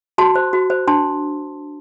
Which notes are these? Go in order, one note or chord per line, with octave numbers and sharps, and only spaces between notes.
F#4 A5 C6
C5
F#4
C5
D4 A5 C6